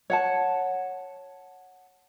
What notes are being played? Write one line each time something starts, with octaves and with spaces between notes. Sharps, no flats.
C#5 F#5 A5